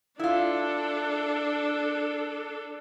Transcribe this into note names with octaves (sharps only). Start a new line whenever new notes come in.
D4 E4 F4 A4